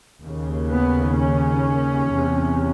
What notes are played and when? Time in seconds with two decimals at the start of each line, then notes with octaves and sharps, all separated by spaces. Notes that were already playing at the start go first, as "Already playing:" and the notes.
0.21 D#2 C#3
0.69 B3
1.17 C#4
2.13 E2 C3